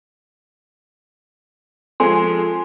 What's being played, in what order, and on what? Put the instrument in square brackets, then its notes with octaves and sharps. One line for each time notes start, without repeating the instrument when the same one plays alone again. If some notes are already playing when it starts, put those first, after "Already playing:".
[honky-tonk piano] F3 G#3 C4 [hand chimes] A4 G#5 C6